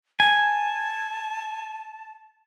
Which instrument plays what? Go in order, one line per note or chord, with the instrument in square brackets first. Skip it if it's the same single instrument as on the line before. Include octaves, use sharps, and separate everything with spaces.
[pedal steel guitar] G#5 [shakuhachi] A5